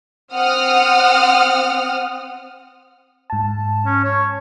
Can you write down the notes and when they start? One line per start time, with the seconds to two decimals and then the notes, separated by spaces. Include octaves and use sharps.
0.34 C4 F#5 D#6 F6
3.30 G#2 A5
3.85 C#4
4.04 C#5